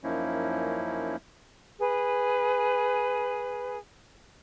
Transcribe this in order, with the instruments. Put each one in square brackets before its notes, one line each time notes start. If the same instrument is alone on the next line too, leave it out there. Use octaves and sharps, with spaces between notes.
[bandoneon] F#2 F3 A#3 C#4 D#4 E4
[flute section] G#4 B4